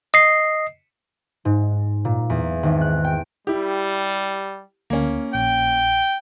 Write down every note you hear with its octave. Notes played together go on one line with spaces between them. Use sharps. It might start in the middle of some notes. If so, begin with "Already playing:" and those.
D#5 C7
G#2
A#2
E2
G#1
F#6
G5
G3 E4 G4
D2 A#3 C#4
A#1 G5